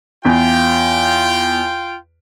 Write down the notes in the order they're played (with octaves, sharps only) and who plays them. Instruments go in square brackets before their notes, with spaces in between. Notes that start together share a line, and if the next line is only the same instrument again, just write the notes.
[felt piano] E2 [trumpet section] F4 G5